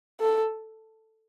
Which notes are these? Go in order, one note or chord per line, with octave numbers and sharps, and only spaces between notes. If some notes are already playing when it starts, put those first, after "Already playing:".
A4